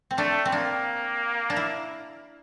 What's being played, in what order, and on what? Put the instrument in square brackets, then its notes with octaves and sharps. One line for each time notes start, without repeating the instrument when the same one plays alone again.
[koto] C4
[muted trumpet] A3 [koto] D4
[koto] C4
[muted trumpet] A#3 [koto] D4
[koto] D4
E4